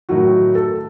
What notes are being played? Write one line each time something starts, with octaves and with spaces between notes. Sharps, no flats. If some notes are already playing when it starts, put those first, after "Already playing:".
A2 D#3 F#3 F#4
A4